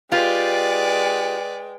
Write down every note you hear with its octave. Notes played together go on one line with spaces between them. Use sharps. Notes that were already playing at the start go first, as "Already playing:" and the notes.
G#3 F4 G4 B4 D5 G5